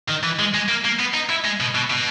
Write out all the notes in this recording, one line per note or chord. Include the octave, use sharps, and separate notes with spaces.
D#3
E3
G#3
G#3
A#3
A#3
B3
D#4
E4
G#3
B2
B2
B2